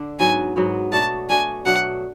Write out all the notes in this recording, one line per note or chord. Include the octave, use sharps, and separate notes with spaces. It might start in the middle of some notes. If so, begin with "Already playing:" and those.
Already playing: D3 D4
G#2 F#3 B3 F#4 G#5
G#2 F#3 B3 F#4
B2 A3 D4 F#4 A5
B2 A3 D4 F#4 G#5
B2 F#3 A3 D4 F#5